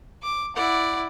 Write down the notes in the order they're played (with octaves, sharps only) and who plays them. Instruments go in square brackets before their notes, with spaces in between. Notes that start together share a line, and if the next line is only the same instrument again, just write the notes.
[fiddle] D6
[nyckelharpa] E4 D5 [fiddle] F#5